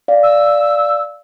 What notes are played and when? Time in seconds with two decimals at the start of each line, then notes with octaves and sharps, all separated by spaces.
0.08 D5 F5
0.23 E6